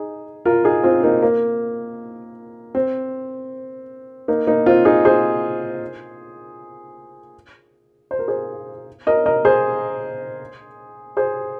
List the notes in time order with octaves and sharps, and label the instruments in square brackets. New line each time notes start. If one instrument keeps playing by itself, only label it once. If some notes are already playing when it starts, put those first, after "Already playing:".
Already playing: [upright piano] D#4 G#4
F4 A#4
D#4 G#4
C4 F4
A#3 D#4
A#3
C4
A#3 D#4
A#3 D#4
C4 F4
D#4 G#4
G#4 C5
C5
A#4
G#4 C5
A#4 D#5
A#4 D#5
G#4 C5
G#4 C5